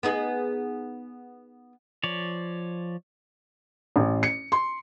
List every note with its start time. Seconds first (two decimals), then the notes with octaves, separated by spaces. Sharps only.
0.03 B3 D#4 G#4
2.03 F3 C#5 D5
3.96 A1
4.23 C#7
4.52 C6